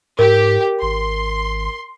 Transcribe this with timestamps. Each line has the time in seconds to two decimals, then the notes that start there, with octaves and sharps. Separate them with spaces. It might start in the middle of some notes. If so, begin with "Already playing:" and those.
0.19 G#2 G4 A#4
0.82 G#1 C6